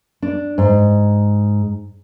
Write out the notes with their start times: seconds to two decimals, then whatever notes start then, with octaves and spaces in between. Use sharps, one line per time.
0.22 D4
0.58 G#2